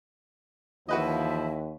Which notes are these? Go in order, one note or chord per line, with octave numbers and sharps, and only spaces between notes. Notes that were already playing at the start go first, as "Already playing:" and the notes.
D#2 E3 F3 E4 F#4 B4 D#5 E5